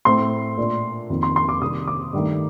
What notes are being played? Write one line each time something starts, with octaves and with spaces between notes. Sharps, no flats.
A2 A3 C4 C6
A#2 A3 D4
F2 D#3 A#3
C6
C6
D6
C3 D#3 G3 A#3 D4 D#6
D6
G2 D#3 A3